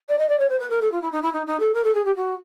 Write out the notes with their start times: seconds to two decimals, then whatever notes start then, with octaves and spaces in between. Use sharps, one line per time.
0.09 D5
0.18 D#5
0.29 D5
0.39 C#5
0.49 C5
0.59 B4
0.70 A#4
0.81 A4
0.92 F4
1.02 E4
1.12 D#4
1.22 E4
1.33 D#4
1.47 D#4
1.59 A4
1.74 A#4
1.84 A4
1.94 G#4
2.05 G4
2.16 F#4